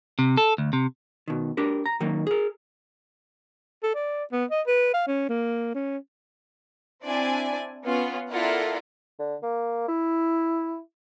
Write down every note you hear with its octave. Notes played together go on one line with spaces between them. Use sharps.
C3
A4
D2
C3
B2 D#3
D4 G4 A#4
A#5
D#3 F#3 A#3 D#4
G#4 A#4
A4
D5
B3
D#5
B4
F5
C#4
A#3
C#4
C4 D4 E4 D5 G#5
B3 C#4 F4
E4 F4 A4 A#4 D5 F#5
D3
A#3
E4